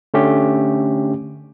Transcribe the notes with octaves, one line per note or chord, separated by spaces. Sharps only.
D3 A3 C#4 G4